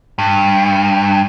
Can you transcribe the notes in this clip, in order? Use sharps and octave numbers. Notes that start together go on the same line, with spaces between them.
G2